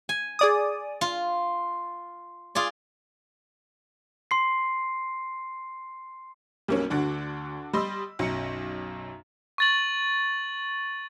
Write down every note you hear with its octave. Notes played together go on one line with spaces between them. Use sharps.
G#5
G#4 D5 D#6
F4
F4 G#4 D5
C6 C7
B1 G3 A#3 C#4
D2 D3 D4 F#4
G3 D#5 B5 C6 E6
B1 F#2 C#7
C#6 A6 F#7